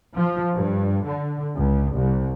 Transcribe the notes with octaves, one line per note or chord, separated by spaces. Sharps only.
F3
G2
D3
C#2
C2